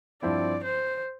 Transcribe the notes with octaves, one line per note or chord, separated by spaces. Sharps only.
G2 F3 C4 E4 D5
C5